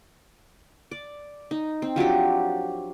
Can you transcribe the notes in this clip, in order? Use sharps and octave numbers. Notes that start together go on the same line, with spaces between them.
D5
D#4
C4
F3 F#3 D4 G4